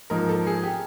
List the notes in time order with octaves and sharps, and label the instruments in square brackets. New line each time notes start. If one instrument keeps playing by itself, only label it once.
[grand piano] G#2 F3 A#3 [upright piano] A#4
[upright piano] A4
G#4
G4